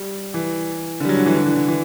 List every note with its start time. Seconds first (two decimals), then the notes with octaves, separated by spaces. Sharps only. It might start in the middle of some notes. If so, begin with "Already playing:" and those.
Already playing: G3
0.34 E3
1.00 D3
1.05 G3
1.09 F#3
1.17 D3
1.26 E3
1.35 D3
1.46 E3
1.56 D3
1.68 E3